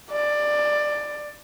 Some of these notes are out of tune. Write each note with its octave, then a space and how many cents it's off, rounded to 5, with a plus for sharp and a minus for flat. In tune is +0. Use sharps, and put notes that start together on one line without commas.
D5 +15